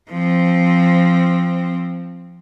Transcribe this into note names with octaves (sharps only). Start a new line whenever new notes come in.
F3 C4